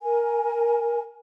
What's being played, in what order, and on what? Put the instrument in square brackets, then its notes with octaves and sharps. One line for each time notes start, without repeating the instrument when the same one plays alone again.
[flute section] A#4 G#5